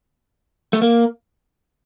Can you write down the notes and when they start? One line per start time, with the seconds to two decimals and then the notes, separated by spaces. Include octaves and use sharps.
0.73 A3
0.82 A#3